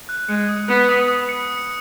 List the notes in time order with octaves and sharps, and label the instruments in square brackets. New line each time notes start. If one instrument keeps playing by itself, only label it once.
[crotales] F#6
[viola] G#3 [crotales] C#7
[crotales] D#6
[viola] B3 [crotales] F#6
[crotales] D#6
D#6
C#7